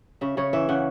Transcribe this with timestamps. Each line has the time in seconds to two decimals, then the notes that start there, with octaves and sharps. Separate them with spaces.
0.21 C#3 E5
0.37 C#3 C#5
0.53 E3 E5
0.69 C#3 F#5